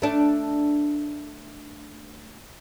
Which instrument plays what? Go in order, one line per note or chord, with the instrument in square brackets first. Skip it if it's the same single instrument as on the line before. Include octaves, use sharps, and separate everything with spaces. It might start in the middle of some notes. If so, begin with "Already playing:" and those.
[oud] A3 D4